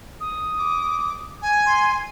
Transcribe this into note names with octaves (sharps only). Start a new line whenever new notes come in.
D#6
D6
G#5
C6